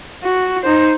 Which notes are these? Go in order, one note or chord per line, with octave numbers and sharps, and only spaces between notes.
F#4
D#4 C5